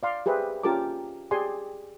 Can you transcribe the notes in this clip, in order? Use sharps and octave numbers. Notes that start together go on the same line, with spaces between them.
D5 F5 C6
G4 G#4 B4 C5 E5
C#4 F4 G4 A#4 A5 D6
G4 G#4 D5 G#5 C6